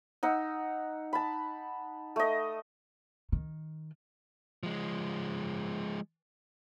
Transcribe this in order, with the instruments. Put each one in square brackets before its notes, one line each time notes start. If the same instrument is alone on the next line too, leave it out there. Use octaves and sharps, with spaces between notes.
[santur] D#4 F#5 E6
A5 B5
A3 D#5
[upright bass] D#3
[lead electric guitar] F3 G#3